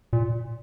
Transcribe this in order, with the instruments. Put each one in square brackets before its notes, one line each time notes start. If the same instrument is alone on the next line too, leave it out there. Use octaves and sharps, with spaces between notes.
[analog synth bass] A#2